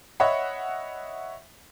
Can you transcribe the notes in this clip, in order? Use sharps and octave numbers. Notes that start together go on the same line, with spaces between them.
C#5 D#5 E5 F#5 B5